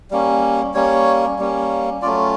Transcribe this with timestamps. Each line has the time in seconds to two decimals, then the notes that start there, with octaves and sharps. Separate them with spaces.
0.11 G3 A#3 C#4
0.74 G3 A#3 C#4 C#5
1.39 G3 A#3 C#4
2.02 F#3 A3 C#4 F4 D5